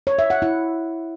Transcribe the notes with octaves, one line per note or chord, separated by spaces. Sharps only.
C#5
E5
F#5
E4